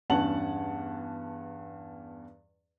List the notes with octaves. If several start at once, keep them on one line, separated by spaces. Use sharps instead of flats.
E2 G2 C#4 F#5 A5 F#7